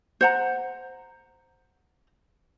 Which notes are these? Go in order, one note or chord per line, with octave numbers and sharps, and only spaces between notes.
C5 F#5 A#5